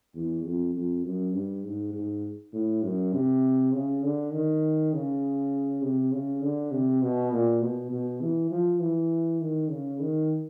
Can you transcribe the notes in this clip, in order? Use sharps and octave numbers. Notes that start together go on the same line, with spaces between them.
E2
F2
F2
F#2
G2
G#2
G#2
A2
F#2
C3
C#3
D3
D#3
C#3
C3
C#3
D3
C3
B2
A#2
B2
B2
E3
F3
E3
D#3
C#3
D#3